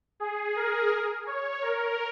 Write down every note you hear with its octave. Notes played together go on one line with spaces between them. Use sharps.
G#4
A#4
C#5
A#4